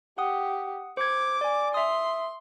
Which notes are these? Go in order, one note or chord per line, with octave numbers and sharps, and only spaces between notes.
G4 F#5 D#6
C5 D6 G#6
D5 G#5
E5 C6 D#6